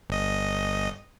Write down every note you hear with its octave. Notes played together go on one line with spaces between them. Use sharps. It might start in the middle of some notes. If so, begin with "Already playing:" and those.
G1 D#5